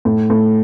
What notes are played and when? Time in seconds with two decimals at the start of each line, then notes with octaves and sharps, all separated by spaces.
0.05 A2
0.30 A2